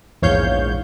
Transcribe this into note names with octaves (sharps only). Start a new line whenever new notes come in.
A#1 E2 G#2 C#5 F5 G6